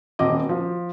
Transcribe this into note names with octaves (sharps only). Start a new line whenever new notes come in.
D#1 C4 D#5 D6
F3